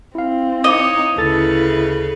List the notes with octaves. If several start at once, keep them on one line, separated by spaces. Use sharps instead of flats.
C4 E4 F5
D#4 C#5 D#5
D2 C#3 E4 A4 B4 A6